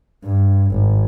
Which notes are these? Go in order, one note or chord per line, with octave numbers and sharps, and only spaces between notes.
G2
G#1